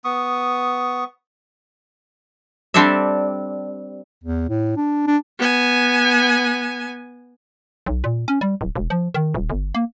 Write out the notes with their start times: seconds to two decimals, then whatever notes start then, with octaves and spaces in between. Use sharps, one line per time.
0.04 B3 C#6 D#6
2.74 G3 C4 D4 A4 D5 E5
4.24 E2
4.49 A2
4.77 D4
5.07 D4
5.39 B3 G#5
7.86 B1
8.04 A#2
8.28 C#4
8.41 G3
8.61 D1
8.76 E1
8.90 F3
9.14 D#3
9.34 D#1
9.50 G1
9.75 A#3